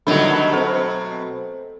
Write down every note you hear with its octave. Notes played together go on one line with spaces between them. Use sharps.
B2 D3 D#3 F#3 G3 A3 B5 F7
C4 A4 C5